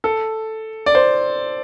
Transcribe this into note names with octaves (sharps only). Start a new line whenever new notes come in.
A4
D5
C5